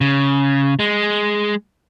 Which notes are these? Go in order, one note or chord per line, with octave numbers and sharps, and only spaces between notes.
C#3
G#3